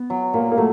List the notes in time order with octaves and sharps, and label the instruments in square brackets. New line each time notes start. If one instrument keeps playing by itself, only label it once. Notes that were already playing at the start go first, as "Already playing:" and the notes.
Already playing: [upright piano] B3
[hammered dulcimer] F#3
[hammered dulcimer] A#2 [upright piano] A#3
[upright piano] A#3
[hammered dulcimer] F#3 [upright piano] A3